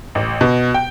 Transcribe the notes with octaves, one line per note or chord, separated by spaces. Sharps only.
A1
B2
G5